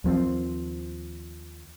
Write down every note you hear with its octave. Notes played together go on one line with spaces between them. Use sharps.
D#2 F3 A3 C4